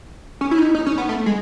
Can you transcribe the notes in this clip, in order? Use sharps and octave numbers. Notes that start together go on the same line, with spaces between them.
C#4
E4
D#4
D#4
C#4
B3
A3
G#3